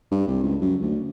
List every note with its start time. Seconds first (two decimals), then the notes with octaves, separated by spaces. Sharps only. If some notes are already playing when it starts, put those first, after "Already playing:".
0.11 G2
0.27 C2
0.43 C#2
0.61 F#2
0.82 D2